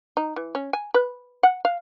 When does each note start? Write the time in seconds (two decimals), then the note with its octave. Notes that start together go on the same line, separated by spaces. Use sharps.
0.17 D#4
0.36 E3
0.55 C#4
0.73 G#5
0.94 B4
1.43 F#5
1.65 F5